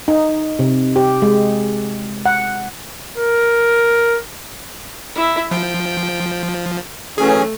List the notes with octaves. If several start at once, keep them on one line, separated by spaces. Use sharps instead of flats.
D#4
C3
G4
G#3
F#5
A#4
E4 E5
F3 G5
E3 F#3 A3 C#4 G#4